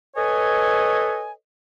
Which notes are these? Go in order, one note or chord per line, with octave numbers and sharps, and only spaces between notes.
A4 B4 C#5 D#5 G#5